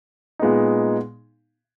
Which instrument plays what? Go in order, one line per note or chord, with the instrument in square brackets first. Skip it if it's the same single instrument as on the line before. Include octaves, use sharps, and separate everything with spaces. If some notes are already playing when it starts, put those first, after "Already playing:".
[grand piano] A#2 G#3 B3 D#4